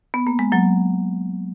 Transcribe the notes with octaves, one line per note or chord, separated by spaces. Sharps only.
B3
A#3
G#3
F#3 A#3